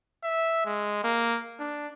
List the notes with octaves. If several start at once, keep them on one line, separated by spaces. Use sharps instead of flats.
E5
G#3
A#3
D4